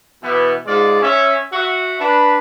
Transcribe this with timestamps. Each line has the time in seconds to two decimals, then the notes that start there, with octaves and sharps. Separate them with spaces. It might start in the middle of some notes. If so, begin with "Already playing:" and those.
0.23 B2 E3 B3
0.66 G#2 G#3 F4 D5
1.02 C#4 E5
1.51 F#4 E5
1.99 D4 B4